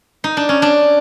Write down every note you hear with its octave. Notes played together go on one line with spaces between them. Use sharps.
D#4
D4
C#4
D4